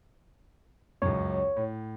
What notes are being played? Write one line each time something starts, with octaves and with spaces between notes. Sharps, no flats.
C#2 F#2 C#5
A2